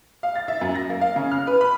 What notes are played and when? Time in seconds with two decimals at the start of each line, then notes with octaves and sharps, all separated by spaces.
0.23 F5
0.36 A6
0.48 E5
0.61 F#2
0.75 A#6
0.90 A#3
1.01 F5
1.16 C#3
1.32 F6
1.47 B4
1.61 B5